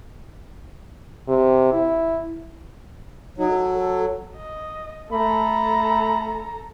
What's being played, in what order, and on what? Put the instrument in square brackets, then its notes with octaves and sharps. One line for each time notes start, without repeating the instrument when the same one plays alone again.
[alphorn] C3
E4
[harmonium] F#3 [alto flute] D#4
[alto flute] A4
A4
[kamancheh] D#5
[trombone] A3 [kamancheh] A4 A#5 [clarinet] B5